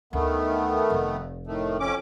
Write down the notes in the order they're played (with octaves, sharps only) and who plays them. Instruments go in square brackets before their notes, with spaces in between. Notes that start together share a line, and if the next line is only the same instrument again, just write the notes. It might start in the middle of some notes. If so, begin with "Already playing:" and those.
[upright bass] D2 [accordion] D#3 A3 B3
[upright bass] F1
[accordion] A2 D#3 A3
F2 C#4 D6